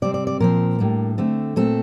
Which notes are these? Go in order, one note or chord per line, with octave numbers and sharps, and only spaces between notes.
C3 G3 C4 D5
D5
D5
A#2 F3 C4 A#4
A2 G3 A#3 D4
D3 A3 C4
A#2 A3 C4 A4